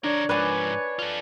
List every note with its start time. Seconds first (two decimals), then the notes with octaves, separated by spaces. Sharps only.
0.04 D3 D4 A#4 C#5
0.29 G#2 F3 B4 C#5 D5 G#5
0.99 F4 A4